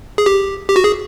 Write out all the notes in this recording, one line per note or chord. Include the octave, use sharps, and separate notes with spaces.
G#4
G4
G4
F#4
G#4